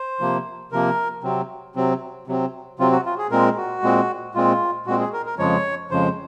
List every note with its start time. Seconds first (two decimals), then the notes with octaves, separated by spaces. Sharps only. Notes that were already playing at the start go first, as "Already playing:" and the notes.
Already playing: C5
0.20 C3 F3 A#3
0.72 C3 F3 A#3 A#4
1.23 C3 F#3 C4
1.75 C3 F#3 C4
2.27 C3 F#3 C4
2.79 C3 F#3 C4 F4
2.92 F#4
3.05 F4
3.18 G#4
3.31 A#2 G#3 C4 A#4
3.57 F#4
3.83 A#2 G#3 C4
4.35 A#2 G#3 C4 F4
4.86 A#2 G#3 C4 F#4
5.00 G#4
5.13 A#4
5.26 A#4
5.38 F2 C#3 F3 G#3 C#5
5.91 F2 C#3 F3 G#3 C5